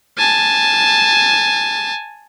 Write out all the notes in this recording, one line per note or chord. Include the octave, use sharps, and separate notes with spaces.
G#5 A5